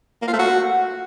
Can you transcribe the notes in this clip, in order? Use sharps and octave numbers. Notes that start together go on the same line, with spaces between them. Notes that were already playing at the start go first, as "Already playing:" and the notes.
A#3
F4
A3
F#4